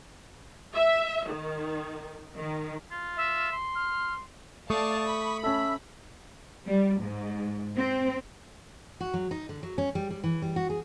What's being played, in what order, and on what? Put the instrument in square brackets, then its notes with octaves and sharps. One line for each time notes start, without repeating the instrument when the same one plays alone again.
[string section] E5
D#3
D#3
[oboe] F4
[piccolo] E5
[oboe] C6
[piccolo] F6
[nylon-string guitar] A3 [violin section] D5 F5 A5 [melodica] C#6 D#6
[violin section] B5
[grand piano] C#4 A4 [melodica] E5
[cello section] G3
G#2
C4
[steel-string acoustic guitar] F#4
F#3
D#4
D3
F#3
C#4
G3
G3
E3
G3
F#4
G#4